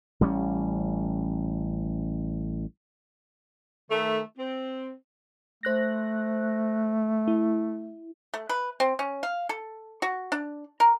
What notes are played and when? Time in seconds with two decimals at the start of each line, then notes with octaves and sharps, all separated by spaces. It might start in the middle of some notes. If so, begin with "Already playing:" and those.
0.21 A1 G3 A3 C#4
3.89 D#3 A3
4.38 C4
5.63 A3 C5 F#6 A#6
7.28 E4
8.34 A3
8.49 B4
8.80 C4
8.99 C#4
9.23 F5
9.49 A4
10.02 F#4
10.32 D4
10.80 A#4